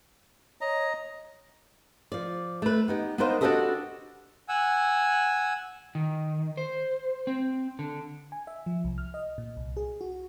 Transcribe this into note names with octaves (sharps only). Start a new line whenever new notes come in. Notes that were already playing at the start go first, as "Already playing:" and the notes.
C#5 D#5 A#5
F3 D5
A3 B4
B3 D#4 G4
B3 D4 D#4 A#4 C5 F5
D4 F#4 G4 A4 B4 D#5
F#5 G#5 E6
D#3
C5
C4
D3
G#5
E5
F3
C2
F6
D#5
A#2
C2
G#4
F#4